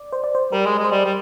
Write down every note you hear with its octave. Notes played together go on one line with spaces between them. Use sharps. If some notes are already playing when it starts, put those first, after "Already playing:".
Already playing: D5
C5
D5
C5
G3 A#4
G#3
G#3
C5
G3 D5
G3